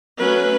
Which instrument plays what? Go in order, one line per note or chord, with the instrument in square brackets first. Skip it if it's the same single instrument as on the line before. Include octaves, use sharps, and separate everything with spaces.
[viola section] F#3 A3 C#4 B4